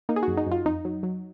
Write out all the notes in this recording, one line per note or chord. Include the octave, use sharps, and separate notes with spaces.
A#3 D#4
G#4
F#2 F#4
D#4
F#2 F4
F2 D#4
F#3
F#3